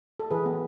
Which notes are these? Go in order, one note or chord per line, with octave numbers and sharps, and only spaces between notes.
A4
E3 G#4 B4
B3